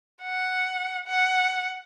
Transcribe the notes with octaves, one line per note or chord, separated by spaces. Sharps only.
F#5
F#5